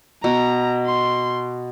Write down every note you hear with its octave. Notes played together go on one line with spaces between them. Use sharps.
B2 A#5
C6